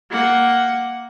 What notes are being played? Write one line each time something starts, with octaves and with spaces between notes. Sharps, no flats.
A#3 F#5